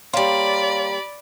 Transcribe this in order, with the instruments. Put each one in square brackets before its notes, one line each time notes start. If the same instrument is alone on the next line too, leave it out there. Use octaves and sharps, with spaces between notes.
[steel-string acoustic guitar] G3 A#3 [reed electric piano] C#5 F5 C6 [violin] D5 B5